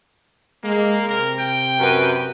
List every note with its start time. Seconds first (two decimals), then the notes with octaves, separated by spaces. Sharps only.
0.64 G#3 A#3
1.09 C3 A#4
1.39 G5
1.79 F#2 B4